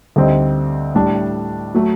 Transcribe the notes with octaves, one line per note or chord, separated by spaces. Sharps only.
D2 D3 G3 C4 D#4
A2 G3 D4
F#3 A3